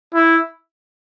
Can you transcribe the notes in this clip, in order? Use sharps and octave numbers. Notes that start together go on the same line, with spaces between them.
E4